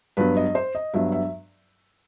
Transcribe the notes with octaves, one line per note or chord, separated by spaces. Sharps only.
G2 F#3 B3 B4
D#5
C5
D#5
G2 F#3 B3 E5
E5